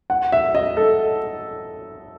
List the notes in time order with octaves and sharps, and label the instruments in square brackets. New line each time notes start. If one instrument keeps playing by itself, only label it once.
[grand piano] F#5
E5
D#5
A4